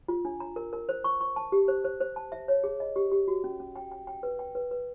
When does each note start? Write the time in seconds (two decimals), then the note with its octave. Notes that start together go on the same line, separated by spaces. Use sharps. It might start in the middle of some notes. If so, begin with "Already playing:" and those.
0.08 F4
0.25 D4
0.40 A#5
0.56 A#4
0.73 A#4
0.89 C5
1.04 C#6
1.21 C#6
1.36 A5
1.52 G4
1.68 C5
1.84 C5
2.01 C5
2.16 A5
2.32 E5
2.48 C#5
2.64 G#4
2.80 D#5
2.96 G4
3.12 G4
3.28 F#4
3.44 C#4
3.60 C#4
3.76 G5
3.92 G5
4.07 G5
4.23 B4
4.39 G5
4.55 B4
4.71 B4